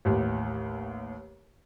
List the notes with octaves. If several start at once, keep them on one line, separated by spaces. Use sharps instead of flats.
A1 D#2